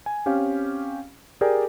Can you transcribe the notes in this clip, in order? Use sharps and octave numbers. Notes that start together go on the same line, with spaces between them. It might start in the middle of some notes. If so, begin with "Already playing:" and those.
G#5
C4 C#4 G4 F5
G4 G#4 A#4 D5 G5 G#5